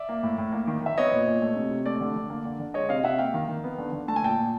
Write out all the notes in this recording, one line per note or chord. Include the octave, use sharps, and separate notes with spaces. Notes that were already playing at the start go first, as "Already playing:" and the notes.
Already playing: D5 E5
A#3
A2
A2
A#3
D#3
D#3 E5
B3 C#5 D#5
A#2
A#2
A3
C3
C3
A3 D5
D3
D3
A#3
D3
D3
G#3 C#5 D#5
C3 D#5 F5
C3 E5 F#5
A#3 F5 G5
D#3
D#3
B3
D3
D3
A3 A5
G#5
A#2 G5 A5
A#2